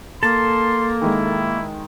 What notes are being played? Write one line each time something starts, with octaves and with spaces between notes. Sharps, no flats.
A#3 A4 A5 C6
D#3 G#3 E4